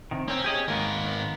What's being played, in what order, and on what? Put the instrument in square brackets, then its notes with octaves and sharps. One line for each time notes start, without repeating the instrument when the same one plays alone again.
[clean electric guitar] C3 D#3
[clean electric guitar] A#3 C4 [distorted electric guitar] C#4
[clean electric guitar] G4 G#4 D#5
[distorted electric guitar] G#2 A#4 [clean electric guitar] D#3 A#3 B3